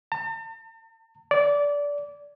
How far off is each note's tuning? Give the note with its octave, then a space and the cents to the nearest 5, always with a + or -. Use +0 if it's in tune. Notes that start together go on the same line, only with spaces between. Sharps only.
A5 +45
D5 -20